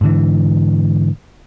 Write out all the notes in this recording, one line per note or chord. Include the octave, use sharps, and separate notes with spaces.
G#2 D3 E3